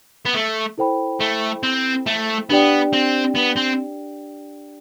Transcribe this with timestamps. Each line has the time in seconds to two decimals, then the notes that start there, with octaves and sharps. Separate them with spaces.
0.25 B3
0.34 A3
0.78 E4 A4 C5 G5 B5
1.20 A3
1.63 C4
2.07 A3
2.50 B3 D4 G4 D5 G5
2.93 C4
3.36 B3
3.57 C4